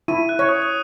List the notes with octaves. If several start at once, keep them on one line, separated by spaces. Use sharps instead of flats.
E4 D#7
F#6
C#5
D#6
D#6